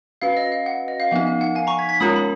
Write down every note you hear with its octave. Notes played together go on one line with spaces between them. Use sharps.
C#4 F#4 B4 F5
D#5
F5
F#5
D#5
F5
F3 B3 D#4 F#5
F5
F#5
F5 G#5
A#5 C#6
G#6 B6
G#6 B6
G#3 C#4 F4 A#4 C#5 B5 D#6
B5